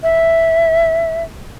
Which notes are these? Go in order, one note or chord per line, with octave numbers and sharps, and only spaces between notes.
E5